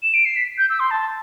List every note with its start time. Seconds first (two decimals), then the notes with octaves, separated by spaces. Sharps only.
0.03 E7
0.14 D7
0.25 C7
0.36 B6
0.58 G6
0.70 E6
0.80 C6
0.91 A5